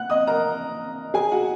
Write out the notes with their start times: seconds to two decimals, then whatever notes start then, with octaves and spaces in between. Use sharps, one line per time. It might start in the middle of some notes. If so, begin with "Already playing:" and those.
Already playing: F#5 F#6
0.10 D#5 D#6
0.27 A#4 A#5
1.14 G#4 G#5
1.32 F#4 F#5